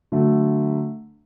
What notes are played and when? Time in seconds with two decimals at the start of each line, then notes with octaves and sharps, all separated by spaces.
0.12 D3 F#3 A3